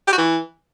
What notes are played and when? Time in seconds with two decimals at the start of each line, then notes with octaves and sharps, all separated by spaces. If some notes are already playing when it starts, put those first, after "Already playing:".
0.07 G4
0.13 F#4
0.18 E3